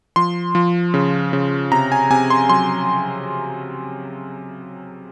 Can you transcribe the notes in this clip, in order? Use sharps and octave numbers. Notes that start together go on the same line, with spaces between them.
F3 C6
F3
C#3
C#3
C3 A#5
G#5
C3 G#5
C6
F#3 C6